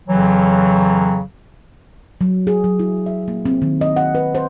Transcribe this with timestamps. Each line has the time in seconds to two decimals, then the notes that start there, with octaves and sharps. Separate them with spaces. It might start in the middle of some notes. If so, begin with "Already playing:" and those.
0.08 F2 C#3 E3 F#3
2.21 F#3
2.47 G#4
2.64 F#3
2.79 E4
3.06 E5
3.28 A#3
3.46 C4
3.62 D#3
3.81 D#5
3.96 F#5
4.15 B4
4.35 C5